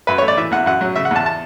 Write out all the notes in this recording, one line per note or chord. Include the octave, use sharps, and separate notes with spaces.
F#2 B4
A3 C#5
D5
E3 E5
E2 F#5
F#2 F#5
F#3
C#3 E5
F#5
E2 A5
A5